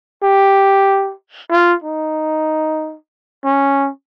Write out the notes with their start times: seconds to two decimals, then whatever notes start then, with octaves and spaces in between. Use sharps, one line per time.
0.23 G4
1.51 F4
1.84 D#4
3.44 C#4